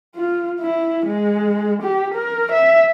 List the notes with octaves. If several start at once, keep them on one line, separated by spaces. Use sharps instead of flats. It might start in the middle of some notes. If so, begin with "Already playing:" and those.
F4
E4
G#3
G4
A#4
E5